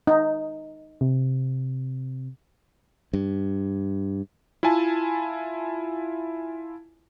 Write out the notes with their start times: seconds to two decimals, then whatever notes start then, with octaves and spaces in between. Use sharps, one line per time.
0.07 D#4
1.01 C3
3.13 G2
4.63 E4 F4 E5 G#5 A5